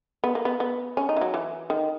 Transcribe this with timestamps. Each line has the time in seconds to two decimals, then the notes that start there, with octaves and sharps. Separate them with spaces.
0.24 B3
0.35 A#3
0.45 B3
0.60 B3
0.97 C#4
1.09 D#4
1.17 E3
1.21 F#3
1.34 E3
1.70 D#3